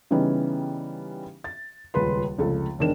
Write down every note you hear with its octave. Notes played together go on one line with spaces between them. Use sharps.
C#3 E3 G3 B3 C#4 D#4
A6
D#1 C#2 B4 C6
F1 C#2 A4
E1 D#3 D4 A#4 E7